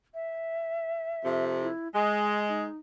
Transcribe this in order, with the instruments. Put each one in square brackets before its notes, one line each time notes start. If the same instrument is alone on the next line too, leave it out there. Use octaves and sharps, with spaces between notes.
[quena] E5
[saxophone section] F2 C3
[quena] E4
[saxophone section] G#3 [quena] G#5
[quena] D#4